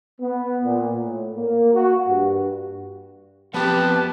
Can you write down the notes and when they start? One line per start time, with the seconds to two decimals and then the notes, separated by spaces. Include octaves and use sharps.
0.21 B3
0.64 A#2
0.99 A2
1.36 A#3
1.74 F#4
2.08 G2
3.54 F3 B3 C4 G4 B4 G5 A5